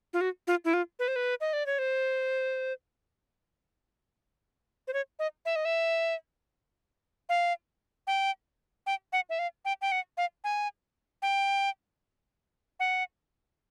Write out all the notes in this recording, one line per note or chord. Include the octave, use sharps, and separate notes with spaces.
F4
F#4
F4
E4
F4
B4
C5
B4
D#5
D5
C#5
C5
C5
C#5
D#5
E5
D#5
E5
F5
G5
G5
F#5
E5
F5
G5
G5
F#5
F5
G#5
G5
F#5